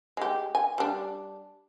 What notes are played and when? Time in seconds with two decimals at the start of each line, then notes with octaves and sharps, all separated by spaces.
0.17 G#3 G4
0.55 G#5
0.78 G3 D4